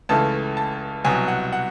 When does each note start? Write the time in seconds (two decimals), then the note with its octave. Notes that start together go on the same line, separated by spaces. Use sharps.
0.09 C#2 C#3 E3 A3 A5
0.57 A5
1.04 C2 B2 F#3 G#5
1.28 F#5
1.52 F#5